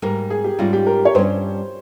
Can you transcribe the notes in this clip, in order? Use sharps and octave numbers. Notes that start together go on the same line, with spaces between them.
G#2 G3 A#3 A#4
G#4
G4
G#2 G3 A#3 C#4 F4
G4
A#4
C#5
G2 G3 C#4 C5